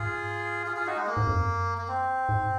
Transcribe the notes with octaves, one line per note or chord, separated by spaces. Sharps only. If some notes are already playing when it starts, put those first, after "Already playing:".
Already playing: G#2 F4 G#4
F4 G#4
F4 G#4
D#4 F#4
G#3
A#3
G#2
F2
F#2
A#3
C4
G#2